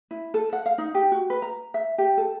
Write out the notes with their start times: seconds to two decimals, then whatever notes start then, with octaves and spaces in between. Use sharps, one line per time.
0.11 E4
0.34 A4
0.53 F#5
0.66 F5
0.78 D#4
0.95 G4
1.12 F#4
1.30 B4
1.42 A#5
1.74 E5
1.98 G4
2.18 A4